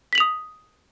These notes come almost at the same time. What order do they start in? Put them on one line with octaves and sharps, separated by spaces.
B6 F#7 F7 D#6